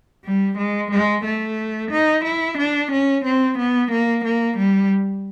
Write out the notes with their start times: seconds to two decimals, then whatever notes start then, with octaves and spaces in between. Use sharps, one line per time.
0.25 G3
0.58 G#3
0.92 G#3
1.24 A3
1.91 D#4
2.25 E4
2.58 D4
2.92 C#4
3.25 C4
3.58 B3
3.91 A#3
4.24 A#3
4.58 G3